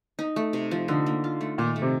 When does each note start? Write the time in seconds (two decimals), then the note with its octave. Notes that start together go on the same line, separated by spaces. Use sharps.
0.19 D#4
0.36 A3
0.53 C3
0.71 F3
0.88 D3 D#4
1.06 A#3
1.24 F4
1.41 A3
1.58 A#2 D#3
1.76 A3
1.82 C3